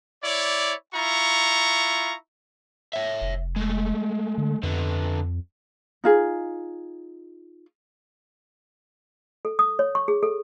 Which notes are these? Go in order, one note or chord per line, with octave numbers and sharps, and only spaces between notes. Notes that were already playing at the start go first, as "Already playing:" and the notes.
E4 C#5 D5
E4 F4 A#5 C#6
C#5 E5
F1
G#3 A3
D3
F2 D3 B3
D#4 F4 G#4
A4
D#6
C#5
C#6
G#4
A4